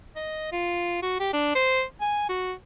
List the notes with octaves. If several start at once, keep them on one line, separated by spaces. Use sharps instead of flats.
D#5
F4
F#4
G4
D4
C5
G#5
F#4